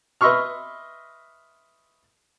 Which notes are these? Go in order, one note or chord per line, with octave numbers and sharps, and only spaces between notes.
B4 D#5 E5 C6 C#6 F6